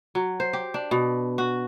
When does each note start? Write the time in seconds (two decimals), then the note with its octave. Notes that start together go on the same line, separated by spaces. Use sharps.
0.15 F#3
0.40 C5
0.53 G4
0.74 D4
0.91 B2
1.38 F#4